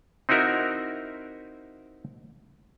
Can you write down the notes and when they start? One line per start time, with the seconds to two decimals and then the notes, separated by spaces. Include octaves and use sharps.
0.29 C4 D#4 E4 F#4 A#4 E5